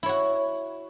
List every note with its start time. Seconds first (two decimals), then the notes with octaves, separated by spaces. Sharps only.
0.03 E4
0.06 C#5
0.09 F#4